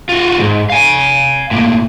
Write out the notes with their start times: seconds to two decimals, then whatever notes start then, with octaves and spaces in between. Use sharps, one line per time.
0.09 F4 F#4
0.38 D2 G#2
0.70 F5 G#5
1.51 A2 A#3